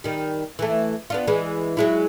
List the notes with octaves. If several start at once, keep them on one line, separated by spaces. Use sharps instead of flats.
D#3 G3
E3 A3
B3 D4 F4
E3 G#3
F#3 G#3 E4